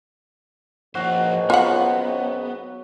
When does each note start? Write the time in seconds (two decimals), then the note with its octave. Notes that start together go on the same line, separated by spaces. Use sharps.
0.95 G#1 C#2 F3 A#3 F#4 C5
1.50 F#3 B3 F4 F#5